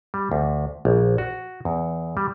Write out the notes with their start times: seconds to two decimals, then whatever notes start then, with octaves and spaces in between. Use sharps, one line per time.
0.14 G3
0.32 D2
0.85 A#1
1.18 F#4
1.65 E2
2.17 G3